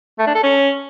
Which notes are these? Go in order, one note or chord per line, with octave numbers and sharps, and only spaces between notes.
A3
D4
A4
C#4